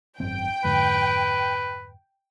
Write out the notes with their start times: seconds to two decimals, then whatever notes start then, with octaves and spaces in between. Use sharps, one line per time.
0.20 G#1 F#2 C4 G5
0.64 F2 G#2 D3 B4